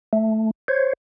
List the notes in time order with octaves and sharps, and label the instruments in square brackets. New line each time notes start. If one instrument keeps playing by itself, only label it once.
[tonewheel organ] A3
C5 C#5